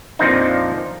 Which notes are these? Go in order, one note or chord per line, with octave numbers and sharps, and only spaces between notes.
F2 A#2 F3 C4 D4 D#4